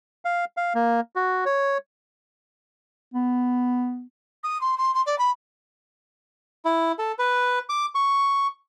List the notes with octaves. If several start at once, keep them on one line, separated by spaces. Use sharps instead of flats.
F5
F5
A#3
F#4
C#5
B3
D#6
C6
C6
C6
D5
B5
E4
A4
B4
D6
C#6